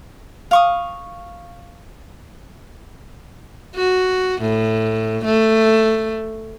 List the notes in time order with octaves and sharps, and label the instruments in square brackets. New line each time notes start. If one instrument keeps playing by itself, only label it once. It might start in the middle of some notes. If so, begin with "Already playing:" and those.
[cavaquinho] F5 C#6 D#6
[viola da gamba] F#4
A2
A3